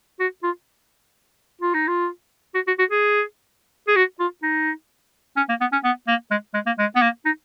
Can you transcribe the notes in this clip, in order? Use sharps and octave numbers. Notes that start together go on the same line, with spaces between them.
F#4
F4
F4
D#4
F4
F#4
F#4
F#4
G#4
G#4
F#4
F4
D#4
C#4
A#3
B3
C#4
B3
A#3
G#3
G#3
A#3
G#3
B3
A#3
D#4